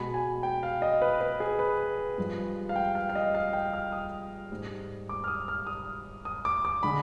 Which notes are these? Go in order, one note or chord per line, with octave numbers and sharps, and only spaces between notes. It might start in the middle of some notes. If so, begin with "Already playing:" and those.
Already playing: B2 G#3 B5
G#5
G5
F5
D#5
B4
B4
G#4
B4
G2 F3 G#3
F5
G5
F5
F5
D#5
F5
G5
F6
D#6
G#2 G3
D6
F6
D#6
F6
D#6
D#6
D6
D6
D3 G#3 B5